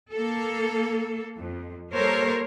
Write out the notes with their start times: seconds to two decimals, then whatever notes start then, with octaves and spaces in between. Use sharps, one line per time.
0.13 A#3 A4
1.37 F2
1.92 G3 A#3 A4 A#4 C5 C#5